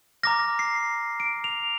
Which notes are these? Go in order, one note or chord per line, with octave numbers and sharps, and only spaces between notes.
A#5 D6 F6 A#6
C7
D7
F7